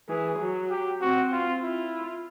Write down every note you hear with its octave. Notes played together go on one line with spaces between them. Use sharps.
E3 G#4
F#3
G4
C4 F#4
F4
E4 F4